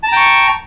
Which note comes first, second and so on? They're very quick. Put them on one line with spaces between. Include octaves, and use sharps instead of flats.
A5 A#5 G5 C#6